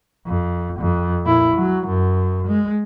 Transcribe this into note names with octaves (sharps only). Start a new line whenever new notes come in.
F2
F2
A#2 E4
F#3
F#2
G#3